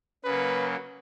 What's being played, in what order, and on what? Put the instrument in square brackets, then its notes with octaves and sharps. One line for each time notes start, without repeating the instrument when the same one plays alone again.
[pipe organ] C#3 F#3 A#3 [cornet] B4